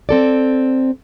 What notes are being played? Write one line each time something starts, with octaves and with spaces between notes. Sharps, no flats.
C4 A4 D5